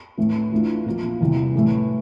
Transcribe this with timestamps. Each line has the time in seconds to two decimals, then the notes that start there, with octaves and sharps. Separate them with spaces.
0.18 A2 E3 A3
0.52 E3 A3 D4 F4
0.86 A#2 F3 A#3 F4
1.21 E2 C3 E3 G3
1.55 A2 E3 A3